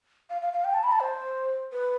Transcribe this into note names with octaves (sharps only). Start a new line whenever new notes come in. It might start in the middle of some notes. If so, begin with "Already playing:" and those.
F5
F5
F5
G5
A5
B5
A5
C5
B4